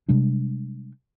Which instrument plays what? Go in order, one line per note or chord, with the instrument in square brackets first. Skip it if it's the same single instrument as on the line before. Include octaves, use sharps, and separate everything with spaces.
[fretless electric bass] C3 G3 G#3 D4